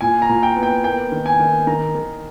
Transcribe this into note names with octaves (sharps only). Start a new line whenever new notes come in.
A#2 G#5
A#5
A#2
G5
B3
G5
A#3 G5
D#3
G#5
D#3
D#3 A#5
D#3